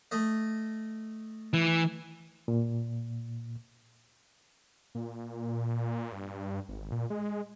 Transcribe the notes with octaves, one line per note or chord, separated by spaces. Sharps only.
A3 D#5
E3
A#2
A#2
G2
G#1
A#2
G#3